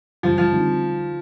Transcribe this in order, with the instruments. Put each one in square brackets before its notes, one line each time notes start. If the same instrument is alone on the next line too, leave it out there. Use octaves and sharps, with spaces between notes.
[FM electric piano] F#2 C#3 E3 G3 [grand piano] F3
[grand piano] F3
[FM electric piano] D3 G3 C4 D#4